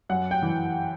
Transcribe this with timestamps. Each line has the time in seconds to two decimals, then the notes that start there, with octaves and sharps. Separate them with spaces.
0.09 F#2 F#5
0.31 G5
0.42 E3